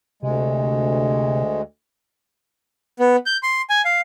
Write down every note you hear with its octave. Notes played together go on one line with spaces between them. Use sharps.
D2 C3 G#3
B3
G6
C6
G#5
F5